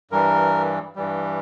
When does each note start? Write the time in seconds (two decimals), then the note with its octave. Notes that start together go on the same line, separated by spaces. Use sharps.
0.11 G2 E3 G3 A#4
0.96 G2 E3 G3